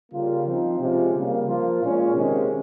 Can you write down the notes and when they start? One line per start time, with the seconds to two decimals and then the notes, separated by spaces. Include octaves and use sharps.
0.12 C#3 G3 A#3 F4
0.46 F3 C4 D#4
0.80 C3 F3 G#3 C#4 F4
1.13 C#3 G3 A#3
1.47 F3 A#3 F4
1.81 A#2 G#3 C#4 F4
2.15 C3 D#3 G#3 C#4